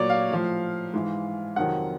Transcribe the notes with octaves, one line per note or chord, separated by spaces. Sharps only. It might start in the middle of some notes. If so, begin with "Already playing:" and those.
Already playing: A#2 F#3 C#5 D5
F5
A2 F3
G#2 E3
F2 C3 D#3 F#3 F#5